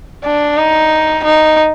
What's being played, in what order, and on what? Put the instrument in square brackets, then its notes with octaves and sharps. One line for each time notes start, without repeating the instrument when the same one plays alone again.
[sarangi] D4
D#4
D#4